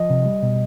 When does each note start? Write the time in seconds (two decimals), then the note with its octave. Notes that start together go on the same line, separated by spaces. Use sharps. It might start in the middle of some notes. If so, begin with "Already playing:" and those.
Already playing: F3 D#5
0.10 C3
0.26 G3
0.43 B2